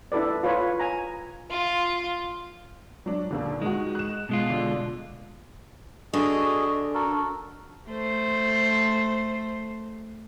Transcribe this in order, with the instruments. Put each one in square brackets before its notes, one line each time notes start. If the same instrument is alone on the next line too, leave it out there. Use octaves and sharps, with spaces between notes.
[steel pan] D4 E4 A4 B4 D5
F4 B4 C#5
G#5 A#5
[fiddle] F4
[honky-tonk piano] F#3 D4
D#2 A#2 D3
[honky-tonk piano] D#3 D#4 F#4 [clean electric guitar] G#3
[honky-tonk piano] F#6 E7
[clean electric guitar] B2 G#3 F4
[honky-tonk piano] D3
[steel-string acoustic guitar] D3 [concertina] F#4 G#4 D#5
[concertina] F#4 A4 A#4
[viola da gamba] A3 C5